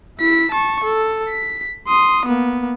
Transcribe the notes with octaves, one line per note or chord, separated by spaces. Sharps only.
E4 B6
A5 C#6
A4
B6
C6 D#6
A#3 B3